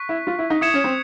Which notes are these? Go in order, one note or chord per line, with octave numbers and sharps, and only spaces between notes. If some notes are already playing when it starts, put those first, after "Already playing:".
Already playing: C#6 F#6 B6
E4
F4
E4
D#4
E4 D#6 G#6 C#7 E7
C#4
C4